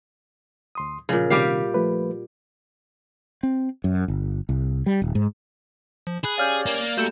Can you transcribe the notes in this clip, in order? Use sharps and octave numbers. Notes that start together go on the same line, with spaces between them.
D2 C6 D#6
A#2 C#3 F3
C3 D#3 G3 G4 F5
F3 A3 B4
C4
F#2
G1
C2
G3
D#1
G#2
F3
G#4 B5 F#6
C#4 G4 C#5 D5 F5 F6 G6
A#3
G3 A3 F#4 A4 E6 G6 C#7 E7